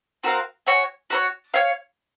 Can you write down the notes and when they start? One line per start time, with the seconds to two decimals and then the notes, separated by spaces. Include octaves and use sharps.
0.23 C4 F#4 A#4 F5
0.67 F#4 C#5 G#5
1.10 F#4 A#4 C#5
1.54 C#5 F5